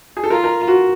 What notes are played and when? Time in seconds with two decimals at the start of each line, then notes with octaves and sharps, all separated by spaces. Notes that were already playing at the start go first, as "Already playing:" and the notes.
0.17 G#4
0.24 A4
0.30 F4 A#4
0.44 A#4
0.68 F#4